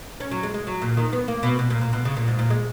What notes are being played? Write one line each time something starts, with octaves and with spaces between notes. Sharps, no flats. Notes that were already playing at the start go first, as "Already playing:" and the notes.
C#4
F#3
G#3
G#3
F#3
A#2
D#3
B3
A#3
B2
B2
A#2
A#2
B2
C#3
A#2
G#2
A#2
G#3